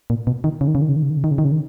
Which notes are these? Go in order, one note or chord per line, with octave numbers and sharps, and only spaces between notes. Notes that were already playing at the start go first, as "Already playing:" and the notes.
A#2
B2
D#3
C#3
D#3
C#3
D#3
C#3
D#3
C#3
D#3
C#3
D#3
C#3
D#3
C#3
D#3